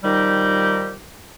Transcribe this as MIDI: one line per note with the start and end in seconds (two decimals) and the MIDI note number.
0.04 0.95 51
0.04 0.95 53
0.04 0.95 55
0.04 0.95 63
0.04 0.95 67